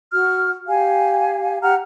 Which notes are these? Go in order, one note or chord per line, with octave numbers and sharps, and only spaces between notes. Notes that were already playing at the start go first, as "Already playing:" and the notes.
F#4 F6
G4 F5 G#5
G4 F#5 A#5 F6